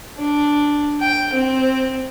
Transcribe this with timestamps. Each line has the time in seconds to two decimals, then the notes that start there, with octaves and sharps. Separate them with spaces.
0.18 D4
1.01 G5
1.33 C4